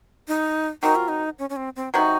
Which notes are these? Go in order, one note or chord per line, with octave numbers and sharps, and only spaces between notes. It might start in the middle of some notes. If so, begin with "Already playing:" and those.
D#4
F#3 C4 D#4 F#4 A#4
F4
D#4
C#4
C#4
C4
C4
C3 F#3 C4 D#4 F#4